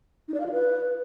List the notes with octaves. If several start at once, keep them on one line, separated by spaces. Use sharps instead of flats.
D#4
D5
F5
F4
B4